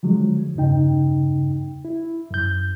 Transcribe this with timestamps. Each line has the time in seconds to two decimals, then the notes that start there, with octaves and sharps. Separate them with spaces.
0.03 D3 F3 F#3 G#3
0.55 E2 G2 C#3 D#4 G5
1.85 E4
2.31 F#2 G6